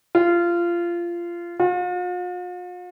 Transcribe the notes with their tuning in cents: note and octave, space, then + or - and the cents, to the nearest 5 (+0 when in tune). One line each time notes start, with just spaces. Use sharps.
F4 -20
F4 +45